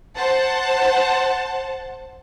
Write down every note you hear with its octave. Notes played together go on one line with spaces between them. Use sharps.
C5 F#5 A5